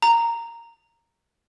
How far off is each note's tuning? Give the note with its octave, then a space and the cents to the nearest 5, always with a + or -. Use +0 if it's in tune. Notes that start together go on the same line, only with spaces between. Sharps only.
A#5 -5